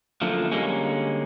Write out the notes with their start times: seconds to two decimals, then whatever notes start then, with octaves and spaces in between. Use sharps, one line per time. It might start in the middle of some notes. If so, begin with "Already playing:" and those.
0.21 F#2 D3 F3 A3 A#3
0.52 D3 G3 G#3 A#3 C#4